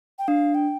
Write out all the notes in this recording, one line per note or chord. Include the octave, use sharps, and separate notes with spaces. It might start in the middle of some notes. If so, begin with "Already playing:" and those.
G5
D4 F5
G5